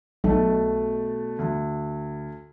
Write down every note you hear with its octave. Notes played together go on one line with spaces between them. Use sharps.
B1 B2 A3
D2